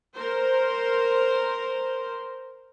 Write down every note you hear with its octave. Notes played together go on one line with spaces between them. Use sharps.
A#4 C5